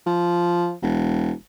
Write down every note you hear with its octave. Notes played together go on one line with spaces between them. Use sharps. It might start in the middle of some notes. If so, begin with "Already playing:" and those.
F3
E1